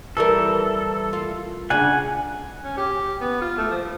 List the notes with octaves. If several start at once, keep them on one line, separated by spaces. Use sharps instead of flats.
E3 G3 A4 A#4
F4
C#3 D4 F#5 G#5
C#4
G4
B3
F4
A3
F3